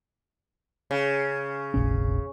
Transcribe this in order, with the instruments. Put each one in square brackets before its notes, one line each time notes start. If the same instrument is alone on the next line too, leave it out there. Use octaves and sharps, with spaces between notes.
[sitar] C#3
[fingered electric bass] F1 A#1 C#4